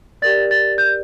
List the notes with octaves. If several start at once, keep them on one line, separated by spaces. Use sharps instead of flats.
G4 A#4 D5 A6
A6
G6